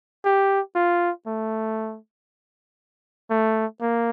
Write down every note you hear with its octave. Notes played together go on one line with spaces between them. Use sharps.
G4
F4
A3
A3
A#3